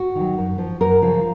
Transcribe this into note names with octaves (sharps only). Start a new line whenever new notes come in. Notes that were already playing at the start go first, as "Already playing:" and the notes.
Already playing: F#4
D#3 F#3
F#2
F3
F#2 A#4
C#3 F3